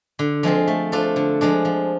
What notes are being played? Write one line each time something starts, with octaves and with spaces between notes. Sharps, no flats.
D3
F3 G#3 C4 F4
A3
D4 F4 A4 C5
D3
F3 G#3 D4
F3